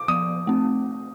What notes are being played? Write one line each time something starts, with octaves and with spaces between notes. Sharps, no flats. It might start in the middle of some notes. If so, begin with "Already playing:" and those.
Already playing: D6
F3 D#6
A3 C4